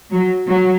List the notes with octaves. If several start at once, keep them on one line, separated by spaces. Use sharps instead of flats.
F#3
F#3